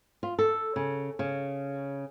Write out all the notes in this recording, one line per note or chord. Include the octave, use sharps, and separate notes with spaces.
F4
A4
C#3
C#3